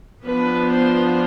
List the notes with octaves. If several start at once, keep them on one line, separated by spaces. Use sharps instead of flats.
F3 B3 D4 B4
C5